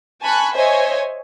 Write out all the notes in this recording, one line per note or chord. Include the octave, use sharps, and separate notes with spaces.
G#5 A5 B5 C#6 F#6
C5 C#5 D#5 E5 G#5